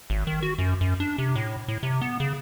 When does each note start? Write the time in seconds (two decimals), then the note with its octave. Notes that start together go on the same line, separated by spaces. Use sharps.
0.10 G#1
0.27 D#3
0.43 F#4
0.58 F#2
0.81 F#2
1.00 D4
1.18 C3
1.36 A2
1.68 A2
1.83 C3
2.01 B3
2.20 C#3